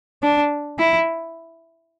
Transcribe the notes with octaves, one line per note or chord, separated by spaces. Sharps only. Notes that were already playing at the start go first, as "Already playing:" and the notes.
D4
E4